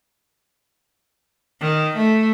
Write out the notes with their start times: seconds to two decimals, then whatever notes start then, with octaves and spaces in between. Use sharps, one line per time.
1.61 D#3
1.96 A3